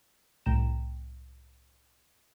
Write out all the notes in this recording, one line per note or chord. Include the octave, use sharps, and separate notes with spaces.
C2 A2 G5 A#5 E7